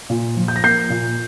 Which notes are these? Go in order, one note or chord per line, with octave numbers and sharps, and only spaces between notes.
A#2
F3
G6
A#6
A#3 G6 C7
A#2